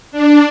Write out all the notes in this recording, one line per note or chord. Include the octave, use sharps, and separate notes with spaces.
D4